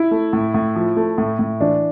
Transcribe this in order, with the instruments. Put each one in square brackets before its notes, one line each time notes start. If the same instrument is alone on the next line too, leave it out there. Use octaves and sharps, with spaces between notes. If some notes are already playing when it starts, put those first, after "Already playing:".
Already playing: [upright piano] E4
[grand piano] A3
A2
A2
F3
A3
A2
A2
[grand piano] E3 [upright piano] D4